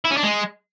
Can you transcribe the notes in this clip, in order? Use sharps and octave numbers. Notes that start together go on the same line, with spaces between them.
E4
C#4
D4
G#3